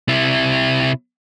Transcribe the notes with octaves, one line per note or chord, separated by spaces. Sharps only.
C3 E4